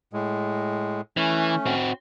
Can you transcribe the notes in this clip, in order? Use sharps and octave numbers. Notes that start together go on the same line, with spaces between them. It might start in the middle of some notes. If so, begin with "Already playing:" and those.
A2 G#3
E3 A3 C#4
C4 F#4